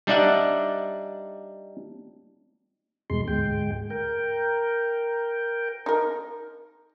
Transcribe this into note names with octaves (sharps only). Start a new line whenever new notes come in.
G3 D4 D#4 D5 E5 F#5
E2 G2 B2 G#3 C6
D2 G#2 G#3 G5
A#4 G5
D#4 A#4